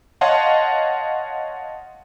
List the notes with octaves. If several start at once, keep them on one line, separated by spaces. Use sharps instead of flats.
C#5 D#5 F5 F#5 A5 C6